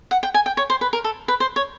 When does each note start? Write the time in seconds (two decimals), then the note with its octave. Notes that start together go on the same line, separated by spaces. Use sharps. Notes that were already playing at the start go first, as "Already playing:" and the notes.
0.11 F#5
0.23 G5
0.34 G#5
0.46 G5
0.57 C#5
0.70 C5
0.81 B4
0.93 A#4
1.04 A4
1.28 B4
1.40 C5
1.56 C#5